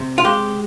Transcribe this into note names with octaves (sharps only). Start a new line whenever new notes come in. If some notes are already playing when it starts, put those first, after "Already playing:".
Already playing: C3
F4
G#3 G4